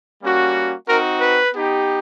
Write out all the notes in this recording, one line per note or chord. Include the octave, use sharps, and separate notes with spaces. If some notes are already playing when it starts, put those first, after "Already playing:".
G3 A#3 C#4 F#4
C4 D#4 F#4 A#4
B4
B3 D#4 G4